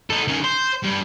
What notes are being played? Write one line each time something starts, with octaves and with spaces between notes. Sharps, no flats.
D#4 A4
D#3 C#4
C5
G2